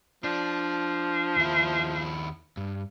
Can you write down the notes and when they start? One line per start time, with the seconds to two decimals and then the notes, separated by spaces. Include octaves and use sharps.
0.24 F3 D4
1.37 D#2 E4
2.57 G2